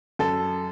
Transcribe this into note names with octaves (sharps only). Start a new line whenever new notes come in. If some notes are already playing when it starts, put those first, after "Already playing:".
F#2 A4